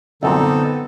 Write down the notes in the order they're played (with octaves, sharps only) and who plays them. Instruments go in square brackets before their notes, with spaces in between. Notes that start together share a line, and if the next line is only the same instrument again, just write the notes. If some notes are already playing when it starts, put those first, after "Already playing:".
[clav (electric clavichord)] C2 F#2 A#2 [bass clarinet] D3 [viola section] B3 [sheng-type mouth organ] C4 D#4 A4